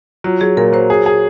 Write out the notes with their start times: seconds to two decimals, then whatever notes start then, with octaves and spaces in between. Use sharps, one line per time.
0.24 F#3 F4
0.41 F#3 G#4
0.57 A#2 A#4
0.73 F#3 C5
0.90 G#4
1.06 G#4